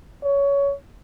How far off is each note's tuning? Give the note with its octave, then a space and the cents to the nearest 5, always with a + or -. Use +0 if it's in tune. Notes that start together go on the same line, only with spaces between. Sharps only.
C#5 +15